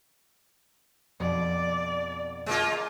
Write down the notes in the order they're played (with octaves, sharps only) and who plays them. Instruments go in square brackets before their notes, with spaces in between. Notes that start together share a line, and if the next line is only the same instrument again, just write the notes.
[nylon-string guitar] F2 B2 D#4 [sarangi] D5
[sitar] G#3 A#3 F4